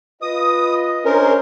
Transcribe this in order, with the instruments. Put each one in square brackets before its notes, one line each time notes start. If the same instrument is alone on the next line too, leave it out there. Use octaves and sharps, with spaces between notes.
[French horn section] F4 B4 [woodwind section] D#5 [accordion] D#6
[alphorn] C#4 [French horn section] D4 G#4 C5 [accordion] A#4